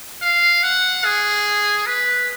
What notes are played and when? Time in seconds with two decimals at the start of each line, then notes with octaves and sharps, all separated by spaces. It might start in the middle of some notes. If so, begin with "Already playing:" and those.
0.22 F5
0.63 F#5
1.05 G#4
1.86 B4